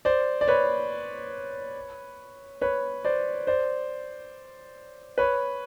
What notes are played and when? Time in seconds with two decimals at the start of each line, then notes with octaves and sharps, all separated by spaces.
0.05 C5 D5
0.41 D5
0.48 B4 C#5
2.61 B4 C#5
3.05 C5 D5
3.47 C5 D5
5.18 B4 C#5